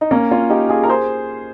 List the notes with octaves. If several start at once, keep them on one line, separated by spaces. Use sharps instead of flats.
D#4
A#3 C#4
C#4 F4
D#4 G4
F4 G#4
A#4
G#4 C5